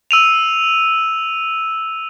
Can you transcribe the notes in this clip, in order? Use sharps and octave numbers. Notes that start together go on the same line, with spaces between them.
E6 D#7 F7